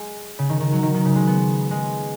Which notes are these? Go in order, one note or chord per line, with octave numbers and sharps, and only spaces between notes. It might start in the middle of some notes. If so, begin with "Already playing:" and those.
Already playing: G#3
C#3
D#3
D#3
F#3
D#3
D#3
C#3
G#3
B3
G#3